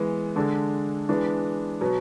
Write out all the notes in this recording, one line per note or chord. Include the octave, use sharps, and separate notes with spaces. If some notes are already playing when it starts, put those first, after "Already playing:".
Already playing: E3 G#3 B3
D3 G#3 D4 A4
E3 G#3 B3 D4
B2 F#3 B3